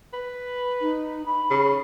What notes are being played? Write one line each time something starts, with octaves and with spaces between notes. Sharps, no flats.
B4
D#4
B5
C#3